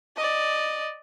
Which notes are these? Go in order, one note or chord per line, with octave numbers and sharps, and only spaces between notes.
D5 D#5